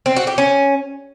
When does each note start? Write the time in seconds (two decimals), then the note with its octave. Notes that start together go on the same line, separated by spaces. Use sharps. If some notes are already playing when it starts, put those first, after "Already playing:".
0.06 C4
0.16 F#4
0.27 G4
0.38 C#4